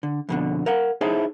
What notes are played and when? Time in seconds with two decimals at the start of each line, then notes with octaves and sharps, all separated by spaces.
0.03 D3
0.29 F2 B2 D3
0.66 A#4 F5 F#5
1.01 D#4 E4 G#4 A4 C5 C#5